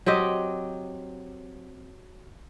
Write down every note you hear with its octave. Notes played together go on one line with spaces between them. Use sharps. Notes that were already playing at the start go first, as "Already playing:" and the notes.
F#3 C4 G4 D#5